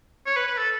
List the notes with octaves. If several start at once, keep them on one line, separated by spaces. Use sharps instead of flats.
C#5
B4
B4
A4